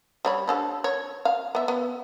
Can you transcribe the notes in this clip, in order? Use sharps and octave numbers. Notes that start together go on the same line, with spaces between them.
G3 C#5 B5
F3 D4 A4
C#5
F5
B3 E5
B3